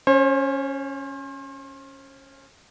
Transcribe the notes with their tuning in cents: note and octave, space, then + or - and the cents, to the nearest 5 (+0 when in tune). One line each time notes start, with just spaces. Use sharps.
C#4 +0 C5 +40